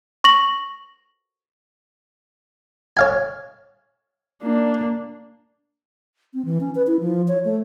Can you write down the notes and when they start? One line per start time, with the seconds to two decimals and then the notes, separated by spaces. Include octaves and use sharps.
0.24 C#6 A#6 F#7
2.97 C#5 F5 G#5
4.43 A#3 D4
6.34 C4
6.45 E3
6.61 C#4
6.75 B4
6.87 E4
7.00 F3
7.28 C#5
7.45 A3